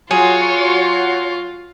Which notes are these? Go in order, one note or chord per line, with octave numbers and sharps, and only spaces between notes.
F#3 F4 F#4 G#4 C#5 C6